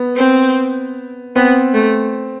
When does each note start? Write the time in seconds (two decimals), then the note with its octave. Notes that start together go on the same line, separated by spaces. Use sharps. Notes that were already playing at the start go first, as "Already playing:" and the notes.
Already playing: B3
0.16 C4
1.36 B3 C4
1.74 A3